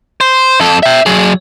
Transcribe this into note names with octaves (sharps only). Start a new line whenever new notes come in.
C5
F2 A4
E5 G5
F#3 G#4